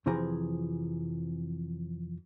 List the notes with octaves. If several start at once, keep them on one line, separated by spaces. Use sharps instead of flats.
F2 C3 E3 F3 G#4 A#5